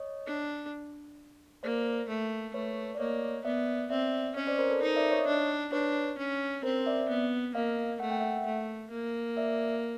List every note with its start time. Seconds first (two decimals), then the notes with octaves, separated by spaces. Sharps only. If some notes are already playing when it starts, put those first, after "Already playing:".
Already playing: C#5 D#5
0.27 D4
1.63 A#3 C5 D5
2.08 A3
2.54 A3 B4 C#5
2.95 D5
3.00 A#3 C#5 D#5
3.45 B3 D5 E5
3.90 C4 D5 E5
4.36 C#4 C#5 D#5
4.47 C5 D5
4.59 A#4 C5
4.70 A4 B4
4.81 D#4 A#4 C5
4.96 D5 E5
5.11 C#5 D#5
5.27 D4
5.72 D4 B4 C#5
6.18 C#4
6.63 C4 A#4 C5
6.86 D5 E5
7.09 B3
7.55 A#3 D#5 F5
8.00 A3 F#5
8.10 G5
8.20 E5 F#5
8.46 A3
8.91 A#3
9.37 D5 E5